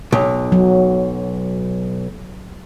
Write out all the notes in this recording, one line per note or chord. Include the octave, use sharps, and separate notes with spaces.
B1
F#3